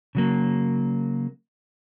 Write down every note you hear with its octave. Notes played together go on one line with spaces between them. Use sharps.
C#3 F#3 A#3